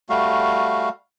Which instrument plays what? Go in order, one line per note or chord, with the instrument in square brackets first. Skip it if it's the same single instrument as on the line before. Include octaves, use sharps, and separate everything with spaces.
[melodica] G3 A3 F#4 F5